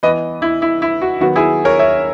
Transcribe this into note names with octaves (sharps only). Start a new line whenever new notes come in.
E3 B3 B4 D#5
E4
E4
E4
F#4
D#3 F#3 B3 F#4
E4 G#4
A#4 C#5
C#5 E5